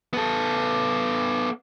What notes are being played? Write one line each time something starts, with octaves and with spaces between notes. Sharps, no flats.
B3 A4